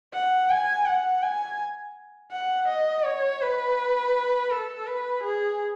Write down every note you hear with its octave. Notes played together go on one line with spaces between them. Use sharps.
F#5
G#5
F#5
G#5
F#5
D#5
C#5
B4
A4
B4
G#4